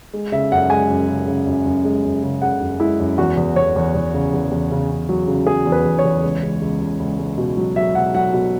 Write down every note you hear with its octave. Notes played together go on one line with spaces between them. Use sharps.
G#3
C#3 E5
F#2 F#5
G#3 G#5
F#2
C#3
C#3
F#2
F#2
G#3
F#2
C#3
C#3 F#5
F#2
G#3 E4
F#2
E2 F#4
E2
E2 C#5
E2
E2
C#3
E2
E2
C#3
C#3
F#3
C#3
F#3 G#4
E2
B4
E2
C#5
E2
C#2
C#2
C#2
C#2
C#2
C#2
B2
F#3
F#3 E5
B2 F#5
F#3 F#5
B2